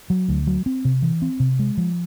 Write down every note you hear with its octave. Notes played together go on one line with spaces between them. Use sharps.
F#3
D2
F#3
C4
C3
E3
C4
C3
G#3
F3